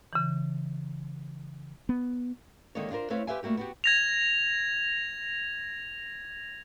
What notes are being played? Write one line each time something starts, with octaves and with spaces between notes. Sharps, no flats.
C#3 E3
B3
D3 D#3 G#3 A#3 D4 C#5
D4 F4 G#4 A#4 C5
A3 C4 E4 B4 C#5 F5
G4 B4 C5 E5 F5 G#5
G3 A3 A#3 F#4 G4
B3 F#4 G4
G#6 A#6 F7